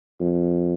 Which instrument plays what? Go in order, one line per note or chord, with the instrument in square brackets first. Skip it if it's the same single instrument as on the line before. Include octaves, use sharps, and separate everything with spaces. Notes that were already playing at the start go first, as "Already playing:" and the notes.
[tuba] F2